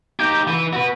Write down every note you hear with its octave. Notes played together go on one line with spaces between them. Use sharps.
D#4 G4 G6
E3
F#4 B4